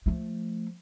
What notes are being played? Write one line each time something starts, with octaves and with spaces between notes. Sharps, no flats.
F3 A3